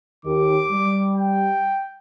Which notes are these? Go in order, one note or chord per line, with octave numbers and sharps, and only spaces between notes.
D#2 D#3 G4 D6
G3
G5